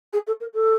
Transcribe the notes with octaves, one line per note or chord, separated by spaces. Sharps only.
G#4
A4
A#4
A4